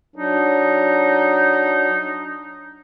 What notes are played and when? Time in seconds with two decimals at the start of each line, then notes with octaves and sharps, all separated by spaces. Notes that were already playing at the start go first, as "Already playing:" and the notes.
0.16 F#3 D4 D#4